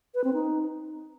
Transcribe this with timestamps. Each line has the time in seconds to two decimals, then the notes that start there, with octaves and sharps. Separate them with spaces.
0.15 B4
0.24 C4
0.34 D#4